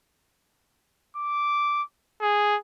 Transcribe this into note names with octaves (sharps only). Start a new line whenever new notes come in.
D6
G#4